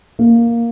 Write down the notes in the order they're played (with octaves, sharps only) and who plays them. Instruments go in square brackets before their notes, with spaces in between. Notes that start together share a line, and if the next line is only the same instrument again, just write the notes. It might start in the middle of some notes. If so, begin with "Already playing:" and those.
[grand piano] A#3